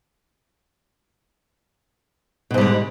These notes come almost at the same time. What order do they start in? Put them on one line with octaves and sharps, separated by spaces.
B2 G#2 G3 D3